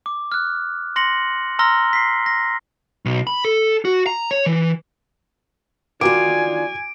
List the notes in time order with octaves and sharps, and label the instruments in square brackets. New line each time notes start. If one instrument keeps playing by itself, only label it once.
[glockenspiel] D6
F6 F#6
C6 A#6 C#7 F#7
A#5 C6 E6 F6 A#6 G7
B6 C7
A#6
[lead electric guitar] B1
B5
A4
F#4
A#5
C#5
E3
[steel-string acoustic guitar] D#3 D4 F4 [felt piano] F#4 D6 [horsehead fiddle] G#5 [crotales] D7